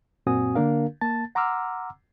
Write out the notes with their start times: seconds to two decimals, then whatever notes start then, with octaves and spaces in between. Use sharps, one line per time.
0.27 F#2 A#2 C4 F#4 G#5 D#6
0.55 D3 A#3 D4 A#4 F5
1.01 A#3 A5 A6
1.35 F#5 A#5 C6 D6 E6 F6